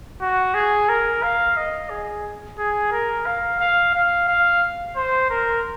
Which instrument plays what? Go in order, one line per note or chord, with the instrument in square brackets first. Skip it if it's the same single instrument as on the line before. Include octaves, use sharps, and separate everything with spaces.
[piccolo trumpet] F#4
G#4
A#4
F5
D#5
G#4
G#4
A#4
F5
F5
F5
F5
C5
A#4